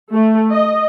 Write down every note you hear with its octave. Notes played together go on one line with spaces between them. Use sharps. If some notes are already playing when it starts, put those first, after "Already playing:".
A3
D#5